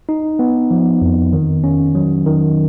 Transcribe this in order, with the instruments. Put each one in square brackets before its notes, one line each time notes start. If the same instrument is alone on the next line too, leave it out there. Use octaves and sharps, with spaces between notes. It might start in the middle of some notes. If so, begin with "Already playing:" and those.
[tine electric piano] D#4
B3
F3
F2
D#3
C#4
F#3
D#3